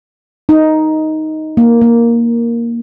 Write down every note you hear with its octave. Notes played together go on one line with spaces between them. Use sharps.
D#4
A#3
A#3